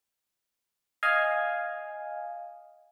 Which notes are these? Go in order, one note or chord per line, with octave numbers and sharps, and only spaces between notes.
D#5 F5 G#5